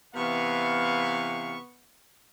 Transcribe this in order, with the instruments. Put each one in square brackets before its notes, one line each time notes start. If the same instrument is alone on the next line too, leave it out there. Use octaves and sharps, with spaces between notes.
[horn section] C3 E3 F5 [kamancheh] B3 C#6